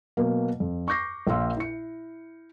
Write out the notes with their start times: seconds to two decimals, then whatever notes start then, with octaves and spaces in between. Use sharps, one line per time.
0.17 B2 F#3 A#3
0.60 F2
0.88 C#6 D6 G6 A#6 C7
1.27 A#1 A#2 F5 C6 E6
1.57 E4 C#7